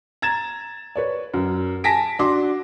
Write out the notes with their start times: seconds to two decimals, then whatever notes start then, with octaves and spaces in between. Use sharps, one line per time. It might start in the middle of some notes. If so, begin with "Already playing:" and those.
0.22 A#5 G#6 A6 E7
0.96 B4 C#5 D5
1.34 F#2
1.84 G#5 A5 A#6 B6 D7
2.19 D4 F#4 C6 D6